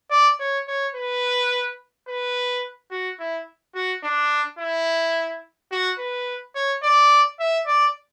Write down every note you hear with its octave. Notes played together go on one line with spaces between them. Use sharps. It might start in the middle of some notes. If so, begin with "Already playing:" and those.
D5
C#5
C#5
B4
B4
F#4
E4
F#4
D4
E4
F#4
B4
C#5
D5
E5
D5